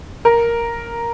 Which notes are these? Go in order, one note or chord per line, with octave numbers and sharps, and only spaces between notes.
A#4